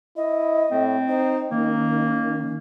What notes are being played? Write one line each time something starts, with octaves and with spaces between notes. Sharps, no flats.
E4 D#5
A2 C4
D#4 C5
D#3 A#3 C#4 D#4